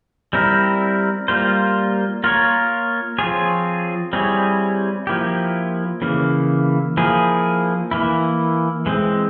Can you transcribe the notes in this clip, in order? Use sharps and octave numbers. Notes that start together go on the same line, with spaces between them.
G3 C4 E4 A#4
G3 A#3 F4 C5
A#3 F4 A#4 C#5
F3 C4 F4 G#4 C#5
G3 C4 E4 G#4 C#5
F3 A#3 E4 G4
C#3 E3 A#3
F3 A#3 E4 G#4
E3 A#3 E4
E3 G#3 C4